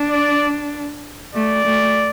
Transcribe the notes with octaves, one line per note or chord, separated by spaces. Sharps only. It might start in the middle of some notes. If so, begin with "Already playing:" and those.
Already playing: D4
D5
A3 D5
A3